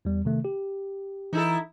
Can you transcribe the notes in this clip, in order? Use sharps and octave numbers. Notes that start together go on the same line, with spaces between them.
E2 G3
C3 D#3 A3
G4
E3 D#4 E4 A4